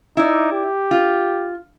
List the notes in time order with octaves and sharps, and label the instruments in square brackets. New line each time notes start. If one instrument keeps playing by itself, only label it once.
[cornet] D#4 [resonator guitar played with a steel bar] E4 D5
[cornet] G4
[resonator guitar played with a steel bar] F4